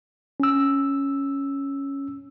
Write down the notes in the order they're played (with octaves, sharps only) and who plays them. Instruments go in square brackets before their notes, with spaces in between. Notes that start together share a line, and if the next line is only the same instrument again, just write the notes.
[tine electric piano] C#4 E6